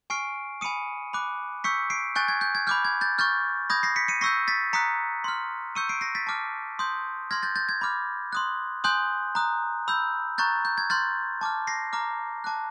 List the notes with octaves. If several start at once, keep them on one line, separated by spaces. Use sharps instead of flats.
G#5 C#6 F6 C7 D7
G#5 B5 D#6 C#7 D#7
B5 D6 F#6
C#6 E6 G6 B6 C#7
C7 D7
G#5 C#6 F#6 G6 A6
G#6
G6
G#6
B5 D6 F6 G6
G#6
G6 A6
C#6 F6 G6 A6
B5 D#6 G6 G#6 A#6
A#6 C7
B6 C#7
C#7 D#7
C#6 E6 G6 A#6 C7
A6 B6
A#5 D#6 F#6 B6 C#7
C6 F6
C#6 E6 G6 C#7 D#7
C7 D7
A#6 C7
A6 B6
A5 D6 F6
C6 D#6 G6
C6 F6 G#6 A#6
G6 A6
G6 A6
G#6
B5 D6 F6
C6 D#6 F#6
G#5 C6 D#6 F#6 G6
A#5 D#6 F#6
B5 E6 G6
A#5 C#6 F#6 G6 A6
G6
G#6
C6 F6 G6 A6
A5 D6 F6
A#6 C7
A#5 D6 F6
A5 D6 F#6